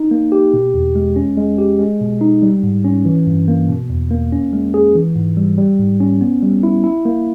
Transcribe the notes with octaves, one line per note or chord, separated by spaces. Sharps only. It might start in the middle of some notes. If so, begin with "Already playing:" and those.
Already playing: D#4
A#3
G4
B2
E2
G#3
C#4
G#3
G4
G#3
B2
D#4
G3
G#2
C#4
E3
G2
A#3
B2
E2
A#3
C#4
G#3
G#4
E3
G#2
G3
G3
G#2
C#4
B3
G3
E4
E4
A#3